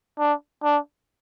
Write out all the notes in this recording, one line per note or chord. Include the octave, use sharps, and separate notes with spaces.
D4
D4